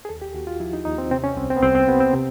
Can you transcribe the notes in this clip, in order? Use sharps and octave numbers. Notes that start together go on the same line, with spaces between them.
G#4
D#2 A4
G4
D#2 F#4
F4
F3 E4
D#4
D#2 D#4
C4
C3 C4
C#4
C2 C4
C4
B3
C2 C4
C4
C3 B3
C4
C3